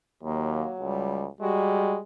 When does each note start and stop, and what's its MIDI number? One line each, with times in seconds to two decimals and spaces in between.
0.23 0.64 39
0.23 1.29 54
0.23 0.75 58
0.80 1.28 37
0.80 1.26 55
1.41 1.99 55
1.41 1.98 56
1.41 1.96 66